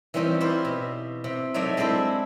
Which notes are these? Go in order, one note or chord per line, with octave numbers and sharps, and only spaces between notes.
E3 G3 C4 C#4 D#4
E4 F4 G4 C5
B2
C3
F#3 A3 D#4 D5 E5
G#3 C4 D4 E4 G4 A4